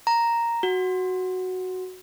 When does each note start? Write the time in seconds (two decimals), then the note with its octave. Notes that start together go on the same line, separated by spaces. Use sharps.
0.07 A#5
0.63 F#4